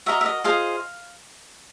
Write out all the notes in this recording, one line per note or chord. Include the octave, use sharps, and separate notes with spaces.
F#4 A#4 D#5 E5
E5
D#5
F4 G#4 C5 D#5 F5